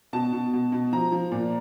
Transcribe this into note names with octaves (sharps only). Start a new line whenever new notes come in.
B2 A5
B2
B2
B2
F3 A#5
F3
A#2